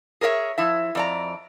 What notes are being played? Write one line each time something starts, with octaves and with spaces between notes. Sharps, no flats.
G#4 A#4 C#5 D5 E5
F3 E4 E5
F2 D5 A#5